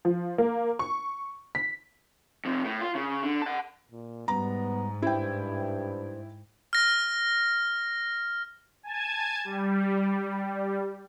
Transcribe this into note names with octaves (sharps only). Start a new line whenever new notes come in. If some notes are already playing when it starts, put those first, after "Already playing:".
F3
A#3
C#6
B6
F2 C3
A2
F4
C#3
D3
F#5 A5
A#2
G#2 G3 B3 A#5
G2 E4 C5 G5
C5
F6 A#6
G#5 A5 G#6
G3